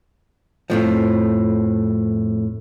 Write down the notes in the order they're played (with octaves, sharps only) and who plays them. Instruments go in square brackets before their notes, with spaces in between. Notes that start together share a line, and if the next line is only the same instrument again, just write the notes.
[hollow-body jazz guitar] F2 A2 F3